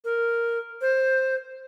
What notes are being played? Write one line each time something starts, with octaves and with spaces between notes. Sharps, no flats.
A#4
C5